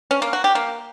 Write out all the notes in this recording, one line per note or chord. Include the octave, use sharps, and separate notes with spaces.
C#4
A#3
F#4
G4
A#3